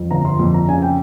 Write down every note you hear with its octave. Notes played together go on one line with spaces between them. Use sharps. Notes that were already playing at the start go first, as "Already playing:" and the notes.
Already playing: F2
G1 A#5
C6
F2
A#5
C#3 G#5
G5